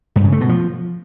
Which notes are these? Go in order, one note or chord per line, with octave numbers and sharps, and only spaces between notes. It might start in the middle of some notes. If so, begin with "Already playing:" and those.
G2
C#3
A3
B2
F3